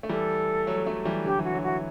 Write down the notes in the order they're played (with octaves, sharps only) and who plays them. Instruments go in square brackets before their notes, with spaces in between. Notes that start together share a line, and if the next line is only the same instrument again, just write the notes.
[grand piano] A3
[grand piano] E3 G3 [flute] A4
[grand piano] F#3 A3
F#3 A3
E3 G3
[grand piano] D3 F#3 [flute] G4
[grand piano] E3 [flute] F#4
[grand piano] D3 F#3
[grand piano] E3 [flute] F#4